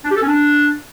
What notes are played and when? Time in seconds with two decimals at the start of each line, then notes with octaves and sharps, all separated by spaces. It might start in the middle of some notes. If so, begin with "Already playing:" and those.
0.05 D4
0.10 G4
0.16 A4
0.22 C#4
0.27 D4